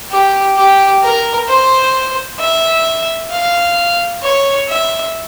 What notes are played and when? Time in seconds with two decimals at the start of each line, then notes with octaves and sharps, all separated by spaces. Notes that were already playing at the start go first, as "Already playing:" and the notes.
0.11 G4
0.56 G4
1.03 A#4
1.49 C5
2.40 E5
3.31 F5
4.23 C#5
4.69 E5